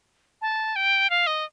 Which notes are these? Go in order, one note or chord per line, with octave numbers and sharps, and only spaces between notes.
A5
G5
F5
D#5